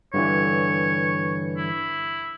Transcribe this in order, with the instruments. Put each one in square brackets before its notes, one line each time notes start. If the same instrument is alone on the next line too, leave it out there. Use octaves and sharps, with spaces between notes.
[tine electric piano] G2 D3 E3 [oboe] C#5
[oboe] E4